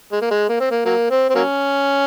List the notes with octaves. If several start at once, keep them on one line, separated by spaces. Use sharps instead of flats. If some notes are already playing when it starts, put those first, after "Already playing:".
G#3
A#3
G#3
A#3
C4
A#3
F#3 A#3
C4
C4
F#3 A#3 C#4